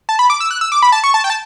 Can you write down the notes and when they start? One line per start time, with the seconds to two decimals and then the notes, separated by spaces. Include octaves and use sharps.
0.09 A5
0.19 B5
0.30 D6
0.40 E6
0.51 F#6
0.61 E6
0.72 D6
0.82 B5
0.92 A5
1.04 C#6
1.14 A5
1.24 G5
1.30 A5